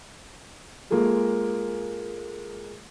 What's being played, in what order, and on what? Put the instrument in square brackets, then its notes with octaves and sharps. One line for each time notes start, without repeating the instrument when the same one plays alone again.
[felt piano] G#3 A#3 F4 G#4 A4